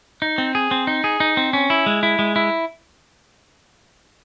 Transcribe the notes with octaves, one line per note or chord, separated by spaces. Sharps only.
D#4
C4
G#4
C4
D#4
G#4
D#4
C4
C#4
E4
G#3
E4
G#3
E4